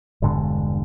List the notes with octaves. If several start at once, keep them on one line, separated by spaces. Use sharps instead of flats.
E1 G2 D3 G#3